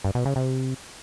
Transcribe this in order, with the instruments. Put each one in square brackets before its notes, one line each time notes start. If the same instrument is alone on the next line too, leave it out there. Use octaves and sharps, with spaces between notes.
[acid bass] G2
B2
C#3
C3